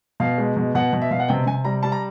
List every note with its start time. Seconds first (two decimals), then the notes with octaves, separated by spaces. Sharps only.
0.20 B2 F5
0.38 G#3
0.57 B2
0.75 B2 F#5
0.93 B2
1.02 E5
1.11 B2 F5
1.20 F#5
1.28 C3 G5
1.46 C3 G#5
1.64 G3 A#5
1.83 G3 A5
1.92 A#5